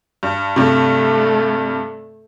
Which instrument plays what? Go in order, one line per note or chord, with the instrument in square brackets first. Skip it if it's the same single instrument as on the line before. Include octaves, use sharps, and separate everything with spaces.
[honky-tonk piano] G2
[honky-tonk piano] G2 C3 [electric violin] A3